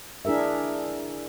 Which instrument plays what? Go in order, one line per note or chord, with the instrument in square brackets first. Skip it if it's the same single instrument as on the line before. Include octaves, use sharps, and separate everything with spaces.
[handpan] D4 E4 G#4 A#4 E5